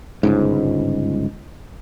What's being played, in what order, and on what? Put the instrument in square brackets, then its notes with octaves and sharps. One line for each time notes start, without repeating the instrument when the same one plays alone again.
[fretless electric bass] G1 C#2 G#2